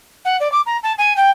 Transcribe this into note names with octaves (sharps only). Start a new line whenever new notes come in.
F#5
D5
D6
A#5
A5
G#5
G5